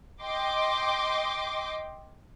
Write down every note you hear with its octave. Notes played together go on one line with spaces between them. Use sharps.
D#5 G5 C6 D6